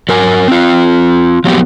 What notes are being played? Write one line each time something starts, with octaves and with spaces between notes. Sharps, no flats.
F#3 A#4 G#5
C4 F4
F3 F#3 A#3 B3 G4